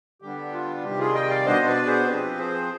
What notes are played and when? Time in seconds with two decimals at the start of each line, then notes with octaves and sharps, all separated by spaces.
0.22 D3 G3 B3 D4 G4
0.53 F4
0.83 C3 D#3 G3 G4
0.99 F4 G#4
1.14 D#5 G5
1.29 D5 F5
1.45 B2 B3 D4 C5 D#5
1.66 B4 D5
1.86 G#4 C5
2.07 F3 C4 G4 B4
2.38 G#4 C5